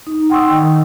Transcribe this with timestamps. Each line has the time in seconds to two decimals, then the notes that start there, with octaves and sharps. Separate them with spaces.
0.07 D#4
0.30 F#5 G5 C6 C#6 D#6 E6
0.50 D#3